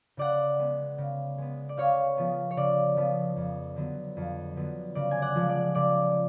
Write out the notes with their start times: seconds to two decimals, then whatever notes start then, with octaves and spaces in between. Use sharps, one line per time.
0.17 C#3 D5 F#5
0.59 G#3 B3
0.98 C#3
1.38 G#3 B3
1.69 D5
1.77 C#3 C#5 F5
2.18 F3 B3
2.51 C#5
2.57 C#3 D5
2.96 F3 B3
3.36 F2
3.76 D3 F#3 B3
4.17 F2
4.56 D3 F#3 B3
4.95 C#3 D5
5.11 G#5
5.22 D5 F#5
5.35 F3 G#3
5.49 D5
5.75 C#3 D5